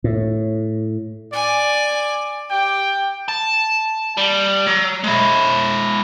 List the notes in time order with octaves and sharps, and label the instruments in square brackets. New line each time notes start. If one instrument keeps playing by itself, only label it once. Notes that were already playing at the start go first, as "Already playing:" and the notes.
[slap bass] A2
[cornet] D5 [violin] G#5
[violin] G4 [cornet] G5
[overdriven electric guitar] A5
G3
F#3
G#3 E4